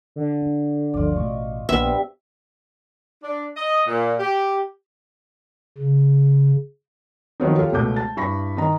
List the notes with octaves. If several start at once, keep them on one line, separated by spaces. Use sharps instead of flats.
D3
D4
G1 D2 F3 F4 D5
A1 B2 A3 D#5 C#6
A#1 G2 C3 A#3 B3 F4 E5
D4
D#5
A#2
G4
C#3
D#3 F3 F#3 B3 D#4
F4 G4 A4 C#5
C#2 B2 A3 D6 G6
A5 A6
G2 E4 B5 C#6 A#6
D#3 D#5 A#5